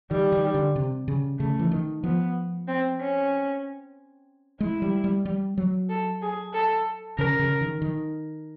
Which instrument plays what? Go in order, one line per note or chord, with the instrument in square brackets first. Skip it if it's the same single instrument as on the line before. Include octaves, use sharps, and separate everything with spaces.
[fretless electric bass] D#3 [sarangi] G3
[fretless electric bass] D#3
D3
C3
C#3
[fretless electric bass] C#3 [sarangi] A3
[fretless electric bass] E3
D#3
[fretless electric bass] F3 [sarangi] B3
[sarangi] C4
C#4
[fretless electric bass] G#3 [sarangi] E4
[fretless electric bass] G3
G3
G3
F#3
[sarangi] A4
G#4
A4
[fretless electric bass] C#3 [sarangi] A#4
[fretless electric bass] C#3
D#3
D#3